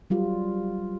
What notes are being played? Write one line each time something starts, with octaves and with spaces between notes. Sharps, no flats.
F#3 G3 F4